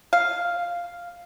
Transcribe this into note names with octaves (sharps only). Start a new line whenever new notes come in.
F5